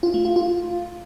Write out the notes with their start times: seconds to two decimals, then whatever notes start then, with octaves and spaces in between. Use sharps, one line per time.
0.03 F4
0.14 A3
0.25 F4
0.36 F4